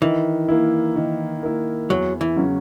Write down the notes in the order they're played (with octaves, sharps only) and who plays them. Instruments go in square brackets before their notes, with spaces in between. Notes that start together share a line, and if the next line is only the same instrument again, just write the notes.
[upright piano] D#3 [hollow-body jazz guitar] E3
[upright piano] A#3 E4
D#3
A#3 E4
[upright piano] E2 [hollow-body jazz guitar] F#3
[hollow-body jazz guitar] E3
[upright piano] C#3 F#3 C#4